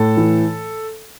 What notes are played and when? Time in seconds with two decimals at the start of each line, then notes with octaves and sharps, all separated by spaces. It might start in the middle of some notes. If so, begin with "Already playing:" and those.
Already playing: A2 A4
0.17 E3